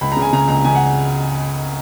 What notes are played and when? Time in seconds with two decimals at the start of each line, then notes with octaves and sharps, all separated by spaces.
0.01 C#2 B5
0.12 A#5
0.17 C#3
0.22 G#5
0.33 C#3 A#5
0.48 C#2 A#5
0.65 C#3 G#5
0.75 F#5